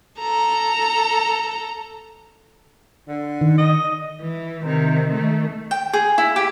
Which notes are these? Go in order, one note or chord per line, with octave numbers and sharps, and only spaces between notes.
A4 A#5
D3
D#3
D#5
E3
C3 D#3
D#3 A3
G5
G#4
E4
G4